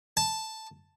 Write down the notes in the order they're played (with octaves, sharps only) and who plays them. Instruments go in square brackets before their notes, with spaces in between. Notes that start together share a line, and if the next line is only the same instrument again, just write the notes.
[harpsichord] A5